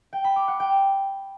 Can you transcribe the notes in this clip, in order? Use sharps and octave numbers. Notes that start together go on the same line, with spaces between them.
G5
B5
D6
F#5
G5